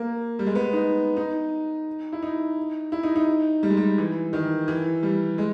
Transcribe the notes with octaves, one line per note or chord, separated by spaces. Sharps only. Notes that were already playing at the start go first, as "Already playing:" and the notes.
Already playing: A#3
G3
G#3
B3
D#4
D#4
E4
D#4
E4
D#4
D#4
G3
G#3
G3
E3
D#3
E3
G3
G#3